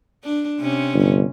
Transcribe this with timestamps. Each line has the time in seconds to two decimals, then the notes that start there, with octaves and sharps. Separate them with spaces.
0.24 D4
0.60 C3 C#4
0.94 G1